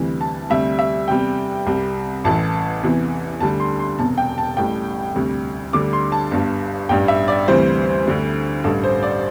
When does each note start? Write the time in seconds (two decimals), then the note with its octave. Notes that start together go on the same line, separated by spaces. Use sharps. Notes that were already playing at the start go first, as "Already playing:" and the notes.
Already playing: D2 C3 E3 G3
0.21 A5
0.50 D2 C3 G3 E5
0.79 E5
1.08 E2 C3 G3 G5
1.66 C2 C3 G3
2.24 A1 A2 E3 A5
2.83 E2 C3 E3
3.40 D2 D3 G3 A5
3.60 C6
3.79 C6
3.98 E1 E2 C3 A5
4.18 G5
4.38 A5
4.57 A1 A2 G3 G5
5.15 D2 C3 G3
5.73 D2 D3 G3 D6
5.93 C6
6.12 A5
6.31 G1 G2 G3
6.89 A1 G2 G3 G5
7.08 E5
7.28 D5
7.48 D2 C3 E3 G3 C5
8.06 D2 D3 G3
8.64 A1 G2 G3 A4
8.84 C5
9.03 D5